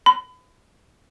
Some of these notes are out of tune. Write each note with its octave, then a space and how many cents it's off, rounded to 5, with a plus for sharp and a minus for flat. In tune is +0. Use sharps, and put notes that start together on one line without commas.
B5 +35